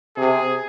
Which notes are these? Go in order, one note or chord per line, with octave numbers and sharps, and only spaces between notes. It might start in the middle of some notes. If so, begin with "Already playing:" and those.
C3 G#4